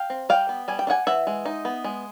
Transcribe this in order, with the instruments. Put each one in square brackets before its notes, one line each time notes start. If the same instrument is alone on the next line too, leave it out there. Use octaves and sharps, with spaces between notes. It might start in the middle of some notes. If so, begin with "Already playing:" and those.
Already playing: [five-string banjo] F5 G5
C4
G3 F5 G5
B3
G3 G#5
G5
D4
F#5 G#5
E3 E5 F#5
G#3
D#4
B3
G#3